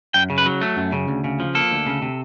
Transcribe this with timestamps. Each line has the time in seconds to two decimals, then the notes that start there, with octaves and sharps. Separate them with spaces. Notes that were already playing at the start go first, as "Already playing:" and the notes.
0.14 F#2 G5
0.30 C#3
0.38 B4
0.46 F#3
0.61 A3
0.77 F#2
0.92 C#3
1.08 D2
1.24 C#3
1.40 F3
1.55 A#3 A4
1.71 D2
1.87 C#3
2.02 C3